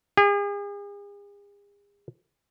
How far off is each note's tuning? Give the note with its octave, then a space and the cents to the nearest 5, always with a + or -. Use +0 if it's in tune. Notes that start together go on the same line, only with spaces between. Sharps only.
G#4 -40